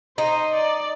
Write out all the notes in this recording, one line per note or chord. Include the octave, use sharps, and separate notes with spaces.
D#4 C5
D5